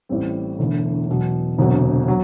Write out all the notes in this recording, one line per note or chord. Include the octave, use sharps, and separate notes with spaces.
A1 A2 G3 C4
E1 E2 D3 A3 E4
E2 B2 F#3
E1 D2 C3 F#3
F#3